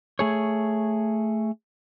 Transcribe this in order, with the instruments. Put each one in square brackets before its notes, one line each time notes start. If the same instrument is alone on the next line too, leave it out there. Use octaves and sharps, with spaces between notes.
[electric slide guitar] A3 G#4 C#5